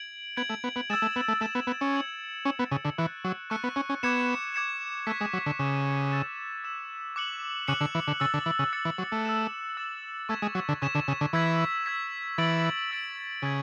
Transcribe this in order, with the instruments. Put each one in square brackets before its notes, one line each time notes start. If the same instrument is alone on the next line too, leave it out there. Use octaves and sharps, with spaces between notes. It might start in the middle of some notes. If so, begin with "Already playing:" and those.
Already playing: [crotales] G#6 D7 F#7
[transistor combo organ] B3 [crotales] G#6 D7 F#7
[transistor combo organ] A3
B3
B3
[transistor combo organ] G#3 [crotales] E6 A6 E7
[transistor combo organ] A3
B3
A3
[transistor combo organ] A3 [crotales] E6 A6 E7
[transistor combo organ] B3
B3
C#4
[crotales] G#6 C#7 F#7
[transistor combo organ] C#4 [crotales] G#6 C#7 F#7
[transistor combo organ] B3
C#3
D3
[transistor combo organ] E3 [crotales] C#6 F#6 C#7
[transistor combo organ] F#3
[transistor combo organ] A3 [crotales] C#6 F#6 C#7
[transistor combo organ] B3
C#4
C#4
[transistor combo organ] B3 [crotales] D6 G#6 C#7 E7
[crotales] D6 G#6 C#7 E7
[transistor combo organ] A3 [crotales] C#6 F#6 B6
[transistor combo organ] G#3
F#3
D3
[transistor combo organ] C#3 [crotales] C#6 F#6 B6
[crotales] E6 A6 E7
E6 A6 E7
D6 F#6 C#7 F#7
[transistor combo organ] C#3 [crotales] D6 F#6 C#7 F#7
[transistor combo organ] D3
E3
D3
[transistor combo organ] C#3 [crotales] E6 A6 C#7
[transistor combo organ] D3
E3
C#3
[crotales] E6 A6 C#7
[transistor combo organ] E3
F#3
A3
[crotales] E6 A6 E7
E6 A6 E7
[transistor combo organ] A3 [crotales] C#6 G#6 B6 E7
[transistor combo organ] G#3
F#3
D3
[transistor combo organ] C#3 [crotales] C#6 G#6 B6 E7
[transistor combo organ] D3
C#3
D3
[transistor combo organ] E3 [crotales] E6 G#6 B6
[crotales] E6 G#6 B6
[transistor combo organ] E3 [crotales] E6 A6 D7 F#7
[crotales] E6 A6 D7 F#7
[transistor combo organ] C#3 [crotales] G#6 B6 D7 F#7